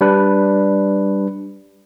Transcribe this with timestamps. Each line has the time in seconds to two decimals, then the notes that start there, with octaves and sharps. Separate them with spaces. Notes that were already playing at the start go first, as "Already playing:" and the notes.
0.01 G3 D4 B4